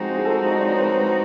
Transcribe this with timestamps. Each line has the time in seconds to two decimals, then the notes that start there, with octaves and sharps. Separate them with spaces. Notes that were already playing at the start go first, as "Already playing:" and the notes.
Already playing: F3 G#3 C4 D#4 F#4 G#4
0.16 G#4
0.25 A4
0.50 D#5
0.58 D5
0.65 C#5
0.73 C5
0.80 B4
0.98 B4